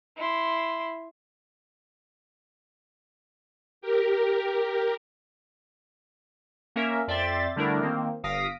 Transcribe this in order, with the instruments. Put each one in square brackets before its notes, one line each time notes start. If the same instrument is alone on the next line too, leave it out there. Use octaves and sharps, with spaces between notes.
[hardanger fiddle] E4 C6
[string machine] G4 A#4
[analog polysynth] A#3 C#4 A#4 E5
F2 D5 E5 G5 C6 A6
D3 G3 A3 D4 E4 A#4
D#3 A#3 C4
G1 F5 D#6 A#6 B6 D7